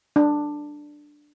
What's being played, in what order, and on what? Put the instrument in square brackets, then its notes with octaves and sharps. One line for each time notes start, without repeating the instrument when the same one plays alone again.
[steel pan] D4